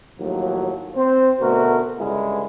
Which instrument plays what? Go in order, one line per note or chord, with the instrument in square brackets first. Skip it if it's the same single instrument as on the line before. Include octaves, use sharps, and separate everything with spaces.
[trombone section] D#2 A2 F3 F#3
C4 C5
D2 B2 A3 F#4 A#4
C#2 G2 D3 G#3 E4